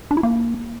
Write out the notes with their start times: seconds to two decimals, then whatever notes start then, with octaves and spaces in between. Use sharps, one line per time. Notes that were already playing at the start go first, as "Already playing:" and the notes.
0.11 D4
0.17 E4
0.23 A#3